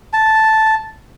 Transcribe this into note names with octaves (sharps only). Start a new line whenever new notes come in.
A5